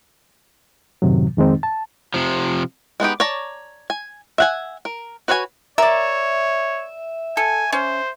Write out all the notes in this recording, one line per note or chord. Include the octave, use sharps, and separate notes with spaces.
F#2 A2 C3 D#3 F#3
F2 D#3 G#3 C4 D#4
A5
C3 F3
G#3 B3 D#4 G4
C#5 D5 A5 A#5
G#5
E5 F#5 G#5
A#4
F#4 B4 C#5 D5 G#5
A#4 C#5 D5 E5
A4 G#5
C#4 C5